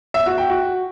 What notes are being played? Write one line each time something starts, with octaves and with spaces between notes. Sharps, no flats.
E5
F#4
G5
F#4